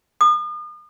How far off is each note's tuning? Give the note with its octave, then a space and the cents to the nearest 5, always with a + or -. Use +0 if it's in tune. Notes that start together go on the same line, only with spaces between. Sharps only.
D#6 -40